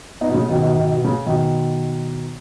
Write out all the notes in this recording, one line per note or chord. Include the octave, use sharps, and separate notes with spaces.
B3 D#4
B2
C#3
B2 D#3
B2 D#3
B2 D#3
B2
C#3
B2 D#3